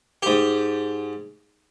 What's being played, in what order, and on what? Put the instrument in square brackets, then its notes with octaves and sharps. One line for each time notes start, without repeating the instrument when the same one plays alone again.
[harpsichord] G#2 G4